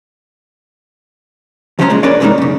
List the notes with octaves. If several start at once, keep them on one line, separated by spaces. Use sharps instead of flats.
C#2 F3 F#3 C#4 C5 A#5
B1 A#2 G#3
C#4 D4 A#4 B4 C#5 D5
G#2 C3 E3 G#3 A#3 D#4
F#2 C#3